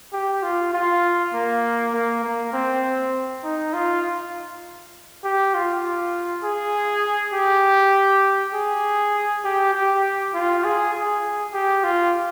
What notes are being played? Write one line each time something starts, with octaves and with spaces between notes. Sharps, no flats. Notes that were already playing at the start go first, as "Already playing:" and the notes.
G4
F4
F4
A#3
A#3
A#3
C4
D#4
F4
G4
F4
G#4
G4
G#4
G4
G4
F4
G#4
G#4
G4
F4